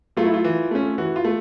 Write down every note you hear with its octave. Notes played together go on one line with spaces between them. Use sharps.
F#3 A3 F4
E4
F4
E3
A3 C#4
E3 F#4
F4
A3